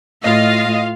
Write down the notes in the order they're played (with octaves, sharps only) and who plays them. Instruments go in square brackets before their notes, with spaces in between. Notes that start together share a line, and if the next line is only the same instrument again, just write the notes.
[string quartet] A2 [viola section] F4 F5 [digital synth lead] D#5